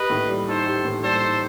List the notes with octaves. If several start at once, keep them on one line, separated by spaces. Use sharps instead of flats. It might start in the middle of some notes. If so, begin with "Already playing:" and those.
Already playing: G4 B4 D#5
A2
G3
D#4 A4 C5
G4
A2
G3 A4 C5
D#4